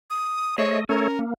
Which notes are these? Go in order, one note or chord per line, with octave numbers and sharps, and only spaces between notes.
D#6
A3 G#4 C5 C#5 D#5
A3 C#4 A4 A#4 C#5
A#3